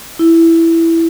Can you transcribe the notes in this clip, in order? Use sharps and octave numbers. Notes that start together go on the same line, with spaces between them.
E4